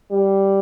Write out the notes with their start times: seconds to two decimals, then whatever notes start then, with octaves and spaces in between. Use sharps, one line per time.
0.11 G3